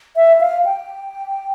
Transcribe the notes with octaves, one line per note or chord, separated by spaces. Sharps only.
E5
F5
G5